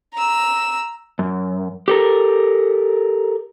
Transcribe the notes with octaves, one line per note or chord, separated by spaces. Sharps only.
A#5 E6
F#2
G4 A4 A#4